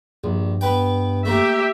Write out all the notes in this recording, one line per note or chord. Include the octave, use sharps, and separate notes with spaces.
A#1 G2
B3 B4 G5
A3 A#3 G4 E5